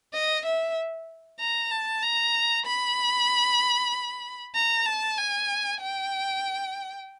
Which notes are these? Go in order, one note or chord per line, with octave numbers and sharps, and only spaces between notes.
D#5
E5
A#5
A5
A#5
B5
A#5
A5
G#5
G5